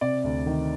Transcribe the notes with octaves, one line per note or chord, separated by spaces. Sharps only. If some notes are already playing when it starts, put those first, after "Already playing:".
C3 D5
D2
D#3